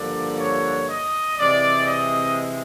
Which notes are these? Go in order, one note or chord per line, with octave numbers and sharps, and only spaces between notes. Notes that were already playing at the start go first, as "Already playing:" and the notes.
Already playing: G2 D3 F3 A#3 D5
C#5
D#5
C3 E3 G#3 C4 D5
D#5